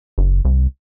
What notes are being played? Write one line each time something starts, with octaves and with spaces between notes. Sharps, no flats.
F#1
C2